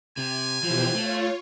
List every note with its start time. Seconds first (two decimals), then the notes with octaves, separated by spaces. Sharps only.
0.17 C3 G#5
0.63 B2 E3 F3 G4 C5
0.95 A3 F4 C#5